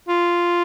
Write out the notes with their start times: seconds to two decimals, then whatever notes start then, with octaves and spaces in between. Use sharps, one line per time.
0.08 F4